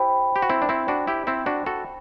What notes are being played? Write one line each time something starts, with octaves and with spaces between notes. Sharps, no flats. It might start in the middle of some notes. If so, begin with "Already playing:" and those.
Already playing: E4 G4 C5 G5 B5
G4
F#4
C4 E4
D4
C4 E4
D4 F#4
E4 G4
C4 E4
D4 F#4
F#4 A4